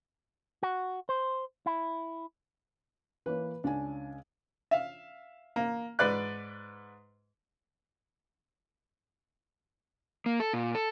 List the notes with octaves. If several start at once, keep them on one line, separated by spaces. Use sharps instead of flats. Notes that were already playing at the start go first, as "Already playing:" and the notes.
F#4
C5
E4
E3 A#3 B4 C#5
C#2 C#4 D4 G#5
E5 F5
A#3
G#2 B4 D5 F#6
A#3
A4
A#2
A4